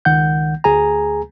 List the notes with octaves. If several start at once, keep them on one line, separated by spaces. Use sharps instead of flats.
C#2 D#3 F#5 G6
D2 G#4 G#5 A#5